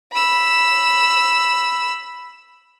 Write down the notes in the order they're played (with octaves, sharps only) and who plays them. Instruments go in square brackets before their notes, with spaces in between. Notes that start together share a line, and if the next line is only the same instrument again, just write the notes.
[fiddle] B5 E6